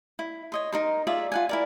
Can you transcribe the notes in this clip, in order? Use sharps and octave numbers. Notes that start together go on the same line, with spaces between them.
E4
C#5 D#5 C6
D#4 A#4 C6
F4 G#4 D5 E5
F4 F#5 G#5
E4 A#4 D5